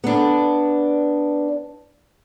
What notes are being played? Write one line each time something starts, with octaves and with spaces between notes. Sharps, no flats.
B3 D4